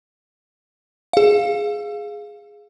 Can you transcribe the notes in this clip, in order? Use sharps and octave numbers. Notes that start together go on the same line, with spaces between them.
G#4 F5